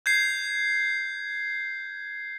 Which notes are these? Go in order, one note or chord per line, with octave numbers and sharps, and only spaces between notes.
G6 G#6 C7